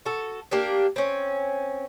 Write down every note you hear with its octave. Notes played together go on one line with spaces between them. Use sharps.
F#4 A4
A#3 D4 G4
C4 C#4